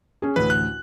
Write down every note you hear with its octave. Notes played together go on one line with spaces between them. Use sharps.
C#4 G#4
A1 D2 B4
F#6